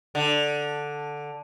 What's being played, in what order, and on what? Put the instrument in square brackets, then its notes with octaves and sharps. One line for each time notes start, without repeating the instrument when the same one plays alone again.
[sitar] D3